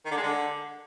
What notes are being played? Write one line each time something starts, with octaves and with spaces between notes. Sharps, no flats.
D#3
D3
G#3
D3